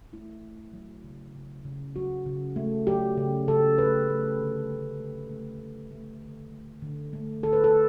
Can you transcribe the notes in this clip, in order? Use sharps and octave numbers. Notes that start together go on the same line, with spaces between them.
A3 E4
A3
F#3
C#3
C#3
C#3
F#3 F#4
C#3
A3
F#3 G4
C#3
C#3 A4
A3 B4
A3
D3
A3
A3
A3
A3
A3
D3
A3
D3
A3
D3 A4
B4
A4